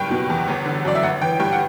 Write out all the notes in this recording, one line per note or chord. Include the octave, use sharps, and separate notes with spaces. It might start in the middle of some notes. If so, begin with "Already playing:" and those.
Already playing: F#1 G2 G5
B2
E2
G1
D3
F#2 D5
E5
G1 F#5
E3 G5
G2 G5
F#5